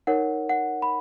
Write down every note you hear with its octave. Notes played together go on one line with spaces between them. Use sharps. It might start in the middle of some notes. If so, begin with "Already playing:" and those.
D#4 A#4 C#5 F#5
F#5
B5